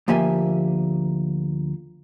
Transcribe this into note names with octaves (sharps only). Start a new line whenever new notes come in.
D2 F3 A#3 G4 E5 G#5